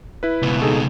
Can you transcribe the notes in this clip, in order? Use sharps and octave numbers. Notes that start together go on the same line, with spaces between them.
E4 B4
C#2 B2
D#4 G#4 A4